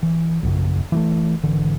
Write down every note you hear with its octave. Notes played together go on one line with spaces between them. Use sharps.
E3
A#1 F#2 C#3
E3 G3 A3
G#1 D3 E3